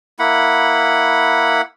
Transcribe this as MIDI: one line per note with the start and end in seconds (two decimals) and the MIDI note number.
0.19 1.62 58
0.19 1.62 64
0.19 1.62 78
0.19 1.62 83